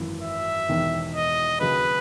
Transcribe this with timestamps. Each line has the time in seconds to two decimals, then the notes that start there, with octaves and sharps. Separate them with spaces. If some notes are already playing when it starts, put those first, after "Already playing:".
Already playing: G#1 F#2 E3
0.22 E5
0.69 E1 E2 D#3
1.15 D#5
1.61 D#2 C#3 F#3 B4